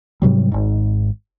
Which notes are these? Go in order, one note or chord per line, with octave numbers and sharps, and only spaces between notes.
G#2 C3 F#3 G3
G#1 G#2